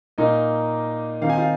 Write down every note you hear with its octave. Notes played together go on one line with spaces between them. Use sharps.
A#2 A#3 D#4 D#5
D#3 C4 D#4 F5
G#5
F4 F5